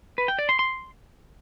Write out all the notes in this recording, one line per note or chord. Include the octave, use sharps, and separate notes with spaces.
B4
G5
D5
C6
C6